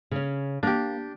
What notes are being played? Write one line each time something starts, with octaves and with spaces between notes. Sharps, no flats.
C#3 C#4
A#3 D4 G4